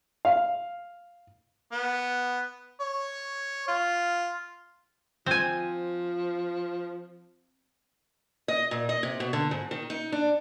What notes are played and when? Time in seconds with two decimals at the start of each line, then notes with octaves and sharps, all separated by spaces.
0.25 F5
1.72 B3
2.81 C#5
3.68 F4
5.26 F3 C4 G#5
8.48 D#5
8.71 A#2
8.89 D#5
9.03 C3
9.20 B2
9.33 D3
9.51 G#2
9.71 D#3
9.90 D#4
10.12 D4